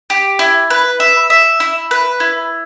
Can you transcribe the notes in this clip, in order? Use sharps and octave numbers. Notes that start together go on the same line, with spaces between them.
G4
E4
B4
E5
E5
E4
B4
E4